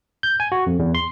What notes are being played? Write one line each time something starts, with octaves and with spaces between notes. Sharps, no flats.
G6
G#5
F#4
F2
E2
C6